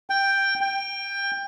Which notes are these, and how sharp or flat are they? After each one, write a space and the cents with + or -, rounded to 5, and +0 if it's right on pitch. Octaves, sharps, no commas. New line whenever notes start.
G5 +5
G5 +20